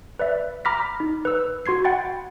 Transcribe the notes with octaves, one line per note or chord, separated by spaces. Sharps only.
B4 D5 E5
A#5 B5 D6 F6 A#6 B6
D#4
B4 E6
F#4 C6 G#6 C7
F#5 G5 B5 A6